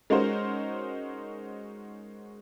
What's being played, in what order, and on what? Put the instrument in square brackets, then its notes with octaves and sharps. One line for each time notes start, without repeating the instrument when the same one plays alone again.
[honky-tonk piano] G#3 C#4 D#4 F#4 A#4 C5